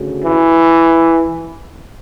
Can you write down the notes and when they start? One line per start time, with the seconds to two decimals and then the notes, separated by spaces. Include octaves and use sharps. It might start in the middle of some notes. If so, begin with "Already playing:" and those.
Already playing: D2 C#3
0.24 E3